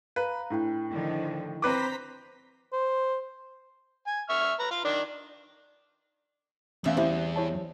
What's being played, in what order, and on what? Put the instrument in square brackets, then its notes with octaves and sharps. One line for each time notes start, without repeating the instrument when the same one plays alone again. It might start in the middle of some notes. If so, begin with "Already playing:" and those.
[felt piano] B4 [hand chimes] F5 A#5
[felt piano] A2 [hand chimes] D4 E4 G5
[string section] D3 D#3 F3
[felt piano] C4 B4 D6 [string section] C5 A#5 B6
[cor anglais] C5
[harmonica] G#5
E5 C#6 F6
B4 A#5
F4 F5
D#3 D4 D5
[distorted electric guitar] E2 [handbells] A3 C#4 F5 [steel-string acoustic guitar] C4 E5
[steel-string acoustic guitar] G3 C4 [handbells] E4 G4 C5
[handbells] E4 C#5 A5